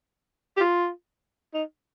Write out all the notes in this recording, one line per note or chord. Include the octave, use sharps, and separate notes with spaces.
G4
F4
D#4